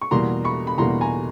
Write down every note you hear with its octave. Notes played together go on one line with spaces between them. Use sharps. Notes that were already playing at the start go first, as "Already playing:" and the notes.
C#6
E2 B2 G3 A#3 A#5 C6
B5 C#6
B5
E2 B2 G3 A#3 A#5 C6
G#5 A#5